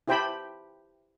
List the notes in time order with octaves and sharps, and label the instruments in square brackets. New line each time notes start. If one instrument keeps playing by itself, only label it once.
[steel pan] E4 G4 C5 G5 A5 B5